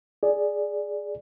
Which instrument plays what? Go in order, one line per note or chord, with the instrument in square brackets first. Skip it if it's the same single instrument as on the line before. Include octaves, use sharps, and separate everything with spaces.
[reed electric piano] G#4 D5